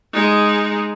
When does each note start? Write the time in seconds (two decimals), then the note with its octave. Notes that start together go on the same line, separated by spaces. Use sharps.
0.14 G#3 D#4